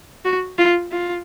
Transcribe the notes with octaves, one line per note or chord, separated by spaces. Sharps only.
F#4
F4
F4